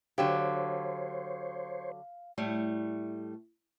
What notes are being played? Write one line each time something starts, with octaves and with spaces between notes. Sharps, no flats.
D3 F#3 G4 C5 C#5 F5
A2 G3 A3